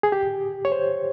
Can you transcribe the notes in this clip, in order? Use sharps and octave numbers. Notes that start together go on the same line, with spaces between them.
G#4
G4
C#5
C5